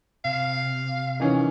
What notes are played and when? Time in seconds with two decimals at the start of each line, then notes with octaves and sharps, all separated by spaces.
0.25 C3 F5
1.20 D#3 E3 C#4